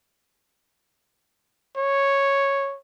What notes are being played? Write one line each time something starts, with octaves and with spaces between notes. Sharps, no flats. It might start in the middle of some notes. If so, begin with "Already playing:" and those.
C#5